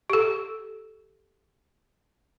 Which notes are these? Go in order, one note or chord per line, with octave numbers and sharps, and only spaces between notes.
G4 A4